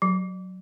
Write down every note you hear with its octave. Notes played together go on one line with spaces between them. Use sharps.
F#3